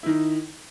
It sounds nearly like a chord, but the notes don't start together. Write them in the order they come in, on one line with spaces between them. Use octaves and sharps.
E4 D#3 D#4